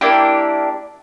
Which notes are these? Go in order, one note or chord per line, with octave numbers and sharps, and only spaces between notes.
A#3 D4 E4 G4